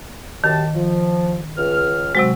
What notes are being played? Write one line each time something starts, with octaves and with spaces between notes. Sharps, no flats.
F#2 D#3 G4 A5
F3
C#2 F6
C3 F#3 G#3 C4 F#4